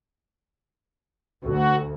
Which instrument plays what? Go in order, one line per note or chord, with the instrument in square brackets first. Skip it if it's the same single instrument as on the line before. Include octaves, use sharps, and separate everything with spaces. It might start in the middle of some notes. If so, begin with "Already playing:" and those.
[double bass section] D2 [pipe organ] F#4